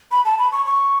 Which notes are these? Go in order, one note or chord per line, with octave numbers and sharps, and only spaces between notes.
B5
A5
B5
C#6
C#6